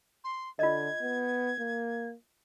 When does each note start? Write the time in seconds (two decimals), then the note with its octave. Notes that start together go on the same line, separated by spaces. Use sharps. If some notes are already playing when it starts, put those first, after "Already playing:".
0.24 C6
0.59 D3 F4 D#5 G#6
1.02 B3
1.60 A#3